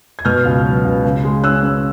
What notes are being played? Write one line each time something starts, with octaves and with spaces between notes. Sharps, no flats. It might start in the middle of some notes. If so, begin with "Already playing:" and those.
G#6
B2 F6 G6
C#2
F#3
C#2
C#3
G#3
C#4 E6 F#6
C#4